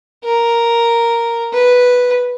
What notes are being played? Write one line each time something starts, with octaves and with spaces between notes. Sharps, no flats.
A#4
B4